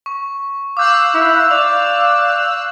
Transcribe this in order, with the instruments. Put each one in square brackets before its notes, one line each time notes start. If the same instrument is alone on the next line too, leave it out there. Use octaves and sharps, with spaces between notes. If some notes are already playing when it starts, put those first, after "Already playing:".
[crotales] C#6
[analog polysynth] F5 E6 F#6 [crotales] D6 G6
[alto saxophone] E4
[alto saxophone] D5 [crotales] F7